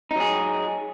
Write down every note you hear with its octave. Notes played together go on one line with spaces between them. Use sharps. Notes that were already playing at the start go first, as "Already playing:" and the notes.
F#3 D#4 G#4